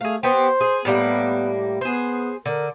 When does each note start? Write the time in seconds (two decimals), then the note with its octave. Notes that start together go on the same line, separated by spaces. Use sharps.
0.01 A3 G#4 F5
0.23 B3 C4 G4 C5
0.61 G#4
0.85 A2 G3 A#3 B3
1.81 B3 G#4 C5
2.46 D3 A#4